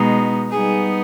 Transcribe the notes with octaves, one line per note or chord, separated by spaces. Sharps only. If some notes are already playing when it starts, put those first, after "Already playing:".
Already playing: B2 G#3 B3 D#4
G3 B3 D#4 G#4